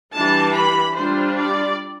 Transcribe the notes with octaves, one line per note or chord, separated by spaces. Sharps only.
E3 G3 D4 A5
B5
G3 D4 F4 C5
D5